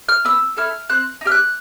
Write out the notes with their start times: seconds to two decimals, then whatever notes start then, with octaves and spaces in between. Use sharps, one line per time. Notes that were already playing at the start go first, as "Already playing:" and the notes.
0.09 F6
0.25 B3 E6
0.57 E4 A4 F6
0.89 C4 F#6
1.21 D#4
1.25 G4 F6
1.32 F#6